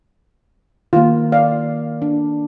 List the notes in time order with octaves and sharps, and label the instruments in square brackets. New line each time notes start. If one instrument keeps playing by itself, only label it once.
[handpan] D#3 A#3 [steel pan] F4
[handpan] D5 [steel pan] F5
[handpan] D4